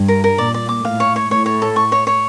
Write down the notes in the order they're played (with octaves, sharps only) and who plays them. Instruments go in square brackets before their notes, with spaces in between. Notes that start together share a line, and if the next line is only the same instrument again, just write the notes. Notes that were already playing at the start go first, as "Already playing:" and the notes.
Already playing: [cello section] G2
[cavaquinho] A#4
A#4
[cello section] A#2 [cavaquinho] D5
[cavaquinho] D5
D6
[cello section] A2 [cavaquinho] F5
[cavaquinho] C#5
C#5
[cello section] A2 [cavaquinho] C#5
[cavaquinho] C#5
A4
C#6
C#5
C#5